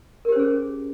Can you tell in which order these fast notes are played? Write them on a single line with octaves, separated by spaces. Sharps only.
A#4 G4 C5 C#4 G#4